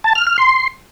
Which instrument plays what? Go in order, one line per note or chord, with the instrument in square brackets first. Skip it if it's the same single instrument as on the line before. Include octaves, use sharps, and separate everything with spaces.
[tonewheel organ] A5
F6
F6
C6